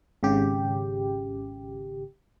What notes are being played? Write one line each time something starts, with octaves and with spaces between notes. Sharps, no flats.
G#1 C#3 G4